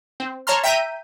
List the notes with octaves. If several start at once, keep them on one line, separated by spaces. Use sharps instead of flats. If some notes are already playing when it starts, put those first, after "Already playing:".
C4
C#5 A5 A#5 C6 F6
E5 G5 A#5 G6 B6 D#7